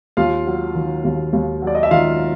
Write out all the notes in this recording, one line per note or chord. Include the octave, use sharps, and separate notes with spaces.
D#2 F4 F5
F#3
D#3
D#2
D#2
F#3
D5
D#5
E5
D#3 F4 F5